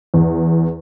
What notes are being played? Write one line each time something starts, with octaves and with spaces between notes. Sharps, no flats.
E2